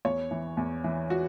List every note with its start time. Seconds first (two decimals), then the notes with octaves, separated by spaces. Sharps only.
0.05 E2 C#5
0.31 E3
0.57 E2
0.84 E3
1.10 F#4